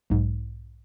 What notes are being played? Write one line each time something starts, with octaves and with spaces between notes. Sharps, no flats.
B1 G#2